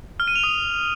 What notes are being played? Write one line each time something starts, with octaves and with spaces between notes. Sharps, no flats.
F6
D#7
F7
D#6